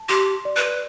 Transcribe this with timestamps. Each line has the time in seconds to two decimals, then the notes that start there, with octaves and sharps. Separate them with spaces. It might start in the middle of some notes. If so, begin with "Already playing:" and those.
Already playing: A5
0.09 G4 C6
0.45 D5
0.56 B4